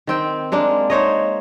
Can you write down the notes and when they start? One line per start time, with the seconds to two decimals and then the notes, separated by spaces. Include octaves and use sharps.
0.07 D#3 C4 G5
0.52 G#3 A#3 D4
0.90 D#4 C5 C#5 D#5